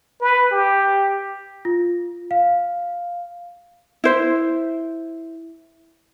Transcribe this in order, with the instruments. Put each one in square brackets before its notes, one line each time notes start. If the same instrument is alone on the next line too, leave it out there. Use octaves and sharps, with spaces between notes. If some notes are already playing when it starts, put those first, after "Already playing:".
[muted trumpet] B4
G4
[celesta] F4
F5
[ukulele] E4 C5 E5